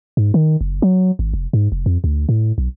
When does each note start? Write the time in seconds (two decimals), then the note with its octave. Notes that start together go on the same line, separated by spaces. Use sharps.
0.17 G#2
0.34 D#3
0.61 F#1
0.82 F#3
1.19 G#1
1.34 F1
1.53 G#2
1.72 F1
1.86 F2
2.04 D2
2.29 A2
2.58 B1